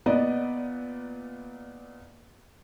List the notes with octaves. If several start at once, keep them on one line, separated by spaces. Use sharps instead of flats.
A#2 B3 B4 D5 D#5